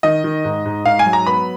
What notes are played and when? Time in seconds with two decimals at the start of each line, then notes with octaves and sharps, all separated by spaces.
0.03 D#3 D#5
0.24 D#3
0.44 G#2
0.65 G#2
0.85 G#2 F5
0.99 G#5
1.06 F#3
1.13 A#5
1.27 B3 B5